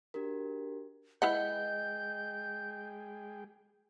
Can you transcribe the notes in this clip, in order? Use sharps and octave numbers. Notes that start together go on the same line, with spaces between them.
D4 F#4 G4 A#4
G#3 E4 G#4 B4 D#5 F#5 G5 G6